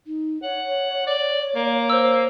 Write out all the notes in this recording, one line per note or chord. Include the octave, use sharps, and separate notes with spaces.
D#4
C#5 F#5
D5
A#3
C5 E6